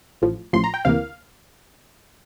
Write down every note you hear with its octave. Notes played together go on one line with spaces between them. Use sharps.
A1 A2 F3
A1 A2 F3 C6
A#5
G5
D2 C3 E3 A#3 F5